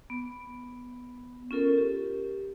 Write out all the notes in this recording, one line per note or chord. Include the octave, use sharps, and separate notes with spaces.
B3
C#4 F4 A4 A#4
G4